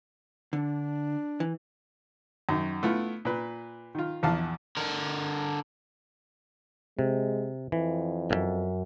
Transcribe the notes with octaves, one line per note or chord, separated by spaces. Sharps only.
D3 D4
E3
F#2 D#3
A3 B3 E4 F4
A#2 B4
D#3 F4
A#1 E2 F5 A5
D3 A#4
C3 G#3
F2 E3
B1 F#2